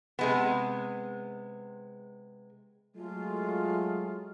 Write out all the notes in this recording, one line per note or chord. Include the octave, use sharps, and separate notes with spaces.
C3 G#3 B3
F#3 G#3 A3 F4